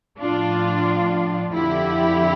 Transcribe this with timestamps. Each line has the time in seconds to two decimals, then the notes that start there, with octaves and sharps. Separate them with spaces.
0.20 A2 F3 D4 F4
1.52 F2 D3 F3 E4 G4